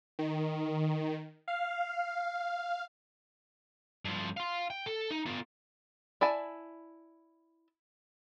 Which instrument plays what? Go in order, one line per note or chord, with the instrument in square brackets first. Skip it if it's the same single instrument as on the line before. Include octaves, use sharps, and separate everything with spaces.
[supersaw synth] D#3
F5
[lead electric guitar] G2 F3
F5 C6
G5
A4
D#4
B3 F4
[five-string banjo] E4 D5 G#5 A5